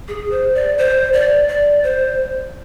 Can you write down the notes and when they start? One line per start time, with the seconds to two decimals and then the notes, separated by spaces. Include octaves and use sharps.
0.08 G#4
0.31 C5
0.55 D5
0.78 C5
1.13 D5
1.48 D5
1.83 C5